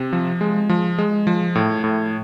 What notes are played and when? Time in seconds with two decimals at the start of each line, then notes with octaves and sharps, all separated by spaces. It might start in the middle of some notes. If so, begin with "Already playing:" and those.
Already playing: C3
0.13 F3
0.41 G#3
0.69 F3
0.98 G#3
1.27 F3
1.55 A2
1.84 A2